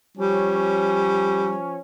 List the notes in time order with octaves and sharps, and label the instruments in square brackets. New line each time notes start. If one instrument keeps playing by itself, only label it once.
[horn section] F3 C#4 [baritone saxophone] G3